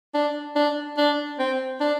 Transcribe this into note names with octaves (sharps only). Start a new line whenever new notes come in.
D4
D4
D4
C4
D4